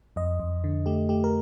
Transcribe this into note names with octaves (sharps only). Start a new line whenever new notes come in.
F2 D#5
F2
D3
A3 G4
A3 G4
A#4